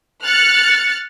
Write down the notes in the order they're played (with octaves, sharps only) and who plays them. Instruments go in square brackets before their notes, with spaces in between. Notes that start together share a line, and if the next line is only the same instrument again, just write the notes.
[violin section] F6 F#6 A6 C#7